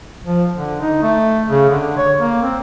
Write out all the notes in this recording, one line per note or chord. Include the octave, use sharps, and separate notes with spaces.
F3
D3
D#4
A3
C#3
D3
C#5
A#3
C4